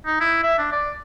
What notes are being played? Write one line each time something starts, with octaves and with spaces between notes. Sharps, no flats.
D#4
E4
E5
D4
D5